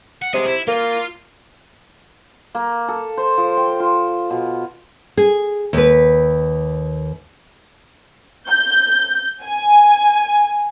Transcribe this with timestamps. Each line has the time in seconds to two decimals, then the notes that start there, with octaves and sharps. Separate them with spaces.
0.22 F#5
0.34 C3 G#4 D#5
0.46 E4
0.68 A#3 F4
2.55 A#3
2.88 A4
3.17 C5
3.38 F3
3.57 G5
3.80 F4
4.30 B2
5.17 G#4
5.73 D#2 B4
8.49 G6
9.42 G#5